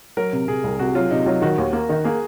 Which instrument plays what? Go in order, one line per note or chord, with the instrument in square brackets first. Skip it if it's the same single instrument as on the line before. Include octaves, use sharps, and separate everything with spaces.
[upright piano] F#3 [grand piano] A#4
[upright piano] C3
[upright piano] C3 [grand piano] G#4
[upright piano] C2
[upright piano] C3 [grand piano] F#4
[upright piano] F#3 [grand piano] F4
[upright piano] C3 [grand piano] D#4
[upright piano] F#3 [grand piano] F4
[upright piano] D#3 [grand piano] F#4
[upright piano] D#2
A#3
D#3
[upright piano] A#3 [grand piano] G#4